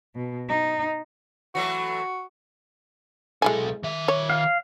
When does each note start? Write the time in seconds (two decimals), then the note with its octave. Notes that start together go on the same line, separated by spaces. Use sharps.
0.15 B2
0.48 D#4
1.55 E3 F#3 A3 F#4
3.42 B1 G#3 E4 A4 G#5
3.83 D#3 E5
4.08 C#5
4.30 F5